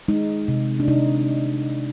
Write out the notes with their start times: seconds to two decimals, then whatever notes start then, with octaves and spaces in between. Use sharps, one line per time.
0.08 G#3 D#4
0.48 C3
0.80 D4
0.88 C3 D#4